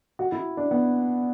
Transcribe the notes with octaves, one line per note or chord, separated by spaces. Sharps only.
F#4
E4
D4
B3